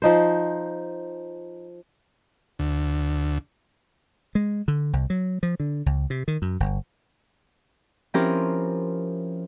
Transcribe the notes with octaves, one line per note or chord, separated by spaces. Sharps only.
F3 D#4 C5
D2
G#3
D3
C2
F#3
F3
D3
C#2
C3
D#3
F#2
G1
F3 C4 C#4 E4 G4 A#4